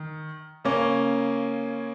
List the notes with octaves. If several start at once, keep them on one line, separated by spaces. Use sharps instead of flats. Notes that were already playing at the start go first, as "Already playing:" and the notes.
Already playing: D#3
C#3 A#3 C#4